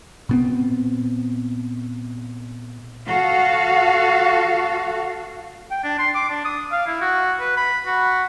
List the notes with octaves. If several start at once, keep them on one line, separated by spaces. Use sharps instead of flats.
A#2 B3 C4
F#4 A4 F5
G5
D4
C6
D6
D4
D#6
F5
E4
F#4
B4
B5
F#4